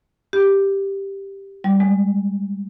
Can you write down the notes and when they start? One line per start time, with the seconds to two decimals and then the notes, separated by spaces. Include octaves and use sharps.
0.33 G4
1.64 G3
1.80 G#3